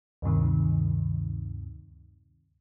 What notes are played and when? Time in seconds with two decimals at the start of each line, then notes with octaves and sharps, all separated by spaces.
0.22 D2 G2 C3 D#3